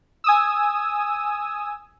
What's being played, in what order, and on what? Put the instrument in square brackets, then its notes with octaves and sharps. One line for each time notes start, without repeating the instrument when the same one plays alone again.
[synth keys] G#5 D#6 E6